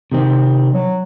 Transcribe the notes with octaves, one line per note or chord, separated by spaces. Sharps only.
C3 D#3 C4
F#3